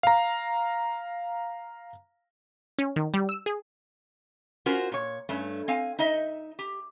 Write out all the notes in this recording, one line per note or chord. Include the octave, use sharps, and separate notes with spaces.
F5 A#5
C#4
D#3
G3
E6
G#4
C#4 F4 F#4 A#4 C5
A#2 C#5
G2 A3 C#4
C4 F5 G#5
D#4 D#5 E5
G4